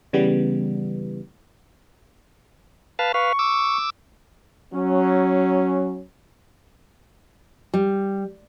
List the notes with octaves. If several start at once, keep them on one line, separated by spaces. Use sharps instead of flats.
C#3 E3 G3 B3
B4 F5 A5
B4 F5 C#6
D6 E6
F#3 C#4
G3